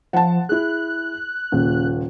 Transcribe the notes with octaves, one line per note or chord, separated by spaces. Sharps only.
F3 F#5 A5
E4 G#4 F#6
D#1 A#2 C#3